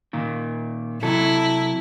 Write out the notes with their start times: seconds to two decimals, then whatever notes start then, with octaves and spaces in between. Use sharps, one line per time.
0.13 A#2 D#3
1.03 C3 F#3 E4 A4